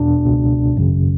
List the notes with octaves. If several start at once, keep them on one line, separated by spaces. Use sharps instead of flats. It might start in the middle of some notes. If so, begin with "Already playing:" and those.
Already playing: E2 B2 D4
C#2 B2
G#1 F#2 C#3